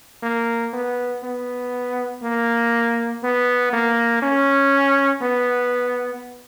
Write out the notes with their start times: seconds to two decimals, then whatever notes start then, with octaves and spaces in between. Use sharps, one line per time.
0.23 A#3
0.73 B3
1.23 B3
2.23 A#3
3.23 B3
3.73 A#3
4.22 C#4
5.22 B3